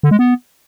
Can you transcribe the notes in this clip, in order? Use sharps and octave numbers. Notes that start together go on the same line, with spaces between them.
D3
G#3
B3